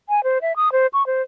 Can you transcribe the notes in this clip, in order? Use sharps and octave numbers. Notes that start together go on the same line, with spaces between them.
G#5
C5
E5
D#6
C5
C#6
C5